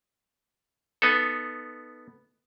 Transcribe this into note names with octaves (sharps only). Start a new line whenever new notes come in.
B3 D#4 A4